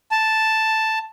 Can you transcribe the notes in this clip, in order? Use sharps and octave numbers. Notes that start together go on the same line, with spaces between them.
A5